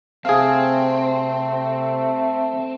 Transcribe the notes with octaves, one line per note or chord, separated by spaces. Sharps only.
C3 A3 C4 G#4 F5